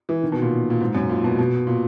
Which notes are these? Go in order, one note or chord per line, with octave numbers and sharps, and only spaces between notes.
E3
D#3
B2
A#2
A#2
G#2
F#2
A#2
B2
B2
A#2